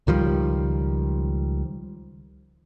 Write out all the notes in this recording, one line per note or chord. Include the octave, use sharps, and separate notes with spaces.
C#2 D#3 F3 G3